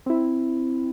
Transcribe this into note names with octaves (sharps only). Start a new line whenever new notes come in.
C4 E4